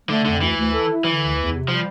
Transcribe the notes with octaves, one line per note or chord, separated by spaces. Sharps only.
D3 A3
F2 D3
D2 E3
D2
A4
E4
D3 E3
D2
E2
C3
F3 G3